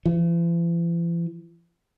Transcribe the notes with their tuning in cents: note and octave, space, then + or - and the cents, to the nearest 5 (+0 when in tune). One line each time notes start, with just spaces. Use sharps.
E3 +45